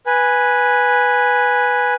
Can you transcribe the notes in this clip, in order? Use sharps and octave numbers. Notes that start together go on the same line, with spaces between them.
B4 G#5